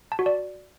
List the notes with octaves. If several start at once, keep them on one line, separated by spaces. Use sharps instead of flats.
A5
F#4
D5